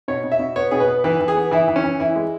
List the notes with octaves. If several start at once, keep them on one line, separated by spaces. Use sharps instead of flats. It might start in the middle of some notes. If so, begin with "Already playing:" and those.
B2 C#5
B2
E5
B2
B3 C#5
B2 G#4
B4
B3
E3 B4
E3
G#4
B3
E3 E4
E3
C#4
E3
E3 E4
G#3